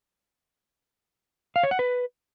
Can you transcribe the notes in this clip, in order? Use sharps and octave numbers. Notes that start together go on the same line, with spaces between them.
F5
C#5
F#5
B4